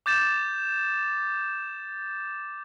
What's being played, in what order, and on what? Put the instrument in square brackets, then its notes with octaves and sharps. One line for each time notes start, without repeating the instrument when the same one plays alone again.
[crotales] D6 G6 A6 E7